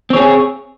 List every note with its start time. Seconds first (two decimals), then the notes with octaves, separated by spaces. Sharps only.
0.10 C4
0.13 C#5
0.16 G#4